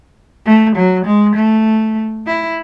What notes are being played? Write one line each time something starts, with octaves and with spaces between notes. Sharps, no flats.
A3
F#3
G#3
A3
E4